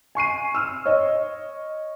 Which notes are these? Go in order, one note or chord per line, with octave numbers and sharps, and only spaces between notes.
G#5 C#6 C7 D#7
E6 F6
C#5 D#5